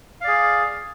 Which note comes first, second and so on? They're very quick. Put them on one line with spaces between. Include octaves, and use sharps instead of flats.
F5 D5 G#4